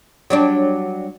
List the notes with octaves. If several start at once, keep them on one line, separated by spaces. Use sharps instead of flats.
F#3 G3 D4